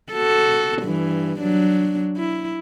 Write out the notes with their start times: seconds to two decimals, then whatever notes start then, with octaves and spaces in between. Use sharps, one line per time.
0.13 F#4 A4
0.83 G2 E3
1.39 F#3 D4
2.17 E4